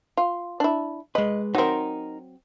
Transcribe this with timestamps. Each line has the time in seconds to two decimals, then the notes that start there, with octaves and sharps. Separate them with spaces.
0.17 F4
0.60 D4 E4
1.15 G#3 B4 D#5
1.55 F#3 C4 D#4 A#4